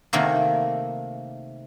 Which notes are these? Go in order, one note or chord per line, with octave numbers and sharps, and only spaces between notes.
C3 D#3 A3 A#3